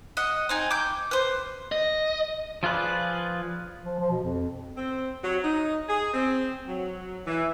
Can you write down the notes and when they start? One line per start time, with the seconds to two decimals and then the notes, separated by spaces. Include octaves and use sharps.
0.17 D#5 F#5
0.49 C4 D#4 G#5
0.71 D6 G6
1.11 B4 C5
1.72 D#5
2.63 F3 F4 G#4 B4 D5
3.84 F3
3.99 F3
4.11 B2
4.24 F2
4.77 C4
5.24 F#3
5.44 D#4
5.89 G#4
6.14 C4
6.68 F#3
7.26 E3